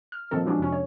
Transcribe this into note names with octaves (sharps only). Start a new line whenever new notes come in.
F6
A#2 D#3 F3 C4 A4
F3 F#3 G#3 C#4 D4 F#4
F2 C3 C#4
C#5